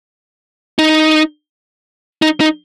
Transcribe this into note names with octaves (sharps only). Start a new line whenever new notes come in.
D#4
D#4
D#4